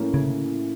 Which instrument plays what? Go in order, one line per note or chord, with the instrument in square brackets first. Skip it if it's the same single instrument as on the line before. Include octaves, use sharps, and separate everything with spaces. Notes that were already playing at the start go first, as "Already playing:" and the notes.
Already playing: [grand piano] A2 E3 A#3 C#4 E4
[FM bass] C#3